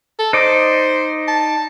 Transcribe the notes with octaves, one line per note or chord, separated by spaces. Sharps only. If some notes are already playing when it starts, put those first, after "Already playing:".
A4
D#4 C5 D5 D#5
A5